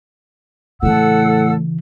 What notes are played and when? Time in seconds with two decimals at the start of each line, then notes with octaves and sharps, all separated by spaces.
0.83 A2 C#3 E3 A4 F#5 E6